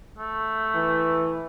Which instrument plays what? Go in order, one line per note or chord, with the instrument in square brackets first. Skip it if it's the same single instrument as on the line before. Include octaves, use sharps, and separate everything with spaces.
[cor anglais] A3
[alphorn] E3